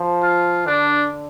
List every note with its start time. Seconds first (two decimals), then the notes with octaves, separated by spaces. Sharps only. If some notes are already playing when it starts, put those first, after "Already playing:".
Already playing: F3
0.23 F4
0.66 D3 D4